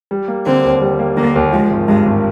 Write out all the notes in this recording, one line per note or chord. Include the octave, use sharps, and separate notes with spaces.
G3
A#3
D3 C4
D#2
G3
A#3
D3 A#3
D#2
F3 G#3
G#1
G2 G#3
G#1